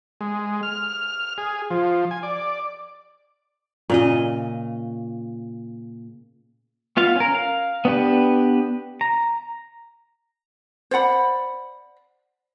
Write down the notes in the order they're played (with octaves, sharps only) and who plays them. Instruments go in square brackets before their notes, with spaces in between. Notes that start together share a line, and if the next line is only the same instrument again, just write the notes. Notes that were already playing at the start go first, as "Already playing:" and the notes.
[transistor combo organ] G#3
F6
G#4
F3
G#5
D5
[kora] A#2 C#3 D#5
[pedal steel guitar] B3 F4 F5
C#4 A#4
F5
B3 D4 G4 B4
A#5
[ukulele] C5 D5 F#5 B5